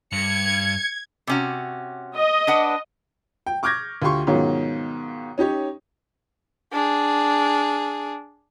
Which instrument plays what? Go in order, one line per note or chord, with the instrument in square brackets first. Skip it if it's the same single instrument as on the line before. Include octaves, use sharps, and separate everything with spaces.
[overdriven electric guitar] G2 [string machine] G#6 [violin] C#7
[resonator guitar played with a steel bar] C3 C#4 F#4
[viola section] D#5
[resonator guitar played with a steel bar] D4 B4 F#5
[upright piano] G5
C#6 D6 F6 G6 G#6 A#6
D2 F4 G4 C6 C#6
G#2 B2 D#3 F#3 C#4 F4
C#4 D#4 G4 C#5
[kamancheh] D4 G#4